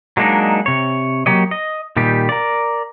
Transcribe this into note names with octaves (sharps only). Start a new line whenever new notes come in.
F#3 G#3 A#3 D4 D#4
C3 C#5
F#3 A#3 G4 C#5 D#5
D#5
A#2 D#3 G3 G4
A#4 D5